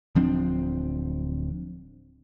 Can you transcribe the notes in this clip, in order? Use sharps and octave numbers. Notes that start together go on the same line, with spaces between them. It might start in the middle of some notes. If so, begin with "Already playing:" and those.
D1 F3 C4 D4